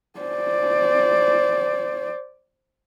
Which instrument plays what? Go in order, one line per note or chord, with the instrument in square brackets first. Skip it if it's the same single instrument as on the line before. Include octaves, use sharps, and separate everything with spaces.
[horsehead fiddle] C5 D5